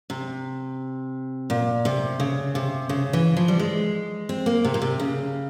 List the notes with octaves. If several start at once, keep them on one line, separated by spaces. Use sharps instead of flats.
C3
A#2
C3
C#3
C3
C#3
E3
F3
G3
G#3
C4
A#3
C3
A#2
C3
C#3